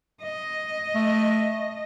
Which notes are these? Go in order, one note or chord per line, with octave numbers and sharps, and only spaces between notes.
D#5
A3